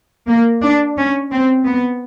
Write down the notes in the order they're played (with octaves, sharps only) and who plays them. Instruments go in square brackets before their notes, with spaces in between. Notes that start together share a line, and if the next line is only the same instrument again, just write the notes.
[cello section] A#3
D4
C#4
C4
B3